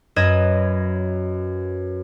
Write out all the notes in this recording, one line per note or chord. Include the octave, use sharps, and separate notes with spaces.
F#2 B4 D#5 G#6 A#6 E7